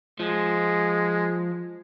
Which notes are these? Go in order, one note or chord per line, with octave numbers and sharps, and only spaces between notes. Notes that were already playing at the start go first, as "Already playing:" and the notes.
F3 G#3